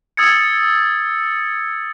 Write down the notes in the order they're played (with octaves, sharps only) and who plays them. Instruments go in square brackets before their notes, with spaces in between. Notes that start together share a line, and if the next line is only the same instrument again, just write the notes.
[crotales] D#6 E6 G#6 A6 C#7